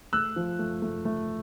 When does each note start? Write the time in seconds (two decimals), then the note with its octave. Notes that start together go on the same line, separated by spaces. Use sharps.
0.13 A3 E6 F#6
0.36 F3
0.59 A3
0.82 A3
1.05 A3